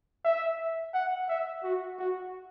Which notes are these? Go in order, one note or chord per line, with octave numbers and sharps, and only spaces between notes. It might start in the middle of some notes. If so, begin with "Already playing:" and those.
E5
F#5
E5
F#4
F#4